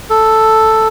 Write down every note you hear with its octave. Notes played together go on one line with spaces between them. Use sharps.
A4